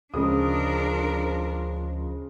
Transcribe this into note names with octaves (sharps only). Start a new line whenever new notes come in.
D2 C#3 F3 G#3 D4 A#4 D#6